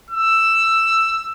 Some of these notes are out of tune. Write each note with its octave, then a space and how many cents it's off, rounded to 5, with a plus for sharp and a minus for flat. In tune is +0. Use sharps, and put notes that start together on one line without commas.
E6 +10